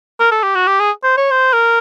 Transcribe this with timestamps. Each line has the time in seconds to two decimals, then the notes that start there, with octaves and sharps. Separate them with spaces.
0.20 A#4
0.32 A4
0.43 G4
0.55 F#4
0.67 G4
0.80 G#4
1.04 C5
1.17 C#5
1.31 C5
1.53 A#4